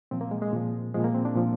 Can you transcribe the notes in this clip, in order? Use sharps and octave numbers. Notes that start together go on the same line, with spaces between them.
A#2 F3 C4
A#3
G#3
G#3
A#2 F3
A#2 F3 G#3
A#3
C4
D4
A#2 F3